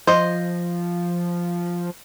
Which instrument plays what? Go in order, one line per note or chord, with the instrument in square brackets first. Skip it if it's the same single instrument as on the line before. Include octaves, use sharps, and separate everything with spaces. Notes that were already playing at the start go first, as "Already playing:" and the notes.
[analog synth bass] F3 [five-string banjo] C5 D#5